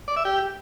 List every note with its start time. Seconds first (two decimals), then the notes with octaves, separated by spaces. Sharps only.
0.08 D5
0.16 E5
0.25 G4